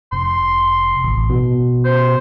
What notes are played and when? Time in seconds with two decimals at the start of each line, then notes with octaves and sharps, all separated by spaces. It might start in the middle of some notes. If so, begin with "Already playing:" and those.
0.12 F1 C6
1.04 A1
1.30 B2
1.85 C5